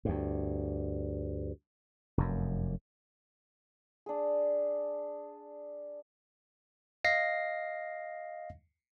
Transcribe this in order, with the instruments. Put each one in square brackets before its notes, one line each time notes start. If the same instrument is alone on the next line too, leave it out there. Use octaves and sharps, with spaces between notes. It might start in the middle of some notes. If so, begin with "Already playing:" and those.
[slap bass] D2 G2
F1 F#2
[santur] D4 G#4
[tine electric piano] D#5 F5 A#6 C7